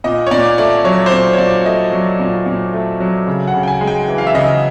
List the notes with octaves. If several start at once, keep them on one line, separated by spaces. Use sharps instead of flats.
A#2 D#5
C#5
A#2 D5
A3 D5
F#3 C#5
C5
A#2 C#5
C#5
A#2 D5
A3 D#5
F#3
A#2
A#2
A3
F#3
C#3
F#5
C#3
G5
G#5
G#3
G5
E3
F5
E5
C#3 D#5